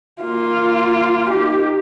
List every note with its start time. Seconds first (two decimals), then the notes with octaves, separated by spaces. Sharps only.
0.22 A#3 F4
1.30 D#4 G4